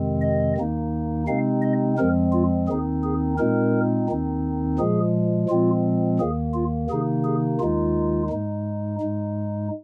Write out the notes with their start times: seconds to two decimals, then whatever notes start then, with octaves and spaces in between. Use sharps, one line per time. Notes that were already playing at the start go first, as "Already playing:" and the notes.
Already playing: F2 C3 D#3 G#3 C4
0.22 D#5
0.57 D#2 D#3 A#3 D#4
1.28 C3 G#3 C4 D#4 F5
1.62 D#5
1.97 F2 F3 G#3 C4 A#4
2.33 F4
2.68 D#2 D#3 C4 D#4 G#4
3.04 G#4
3.38 A#2 G#3 C4 D#4 A#4
4.09 D#2 D#3 C4 D#4
4.79 A#2 F3 G#3 G#4
5.49 A#2 F3 G#3 C4 F4
6.19 D#2 D#3 A#3 G#4
6.54 F4
6.90 C3 D#3 A#3 D#4 G#4
7.25 G#4
7.60 D#2 D#3 G#3 D#4 F4
8.30 G#2 G#3 D#4
9.00 G#2 G#3 D#4